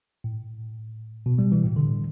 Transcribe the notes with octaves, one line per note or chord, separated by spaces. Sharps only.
A2
B2
G3
E3
A2
D3